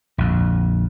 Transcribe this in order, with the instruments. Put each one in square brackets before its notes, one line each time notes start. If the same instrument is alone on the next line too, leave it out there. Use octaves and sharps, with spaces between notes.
[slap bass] A#1 F2